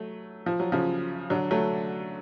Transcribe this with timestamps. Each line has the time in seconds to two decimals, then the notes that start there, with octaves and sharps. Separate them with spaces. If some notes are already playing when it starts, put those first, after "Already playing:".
Already playing: F#3 A3
0.46 F3
0.60 F#3
0.72 C#3 F3
1.30 D3 F#3
1.51 F#3 A3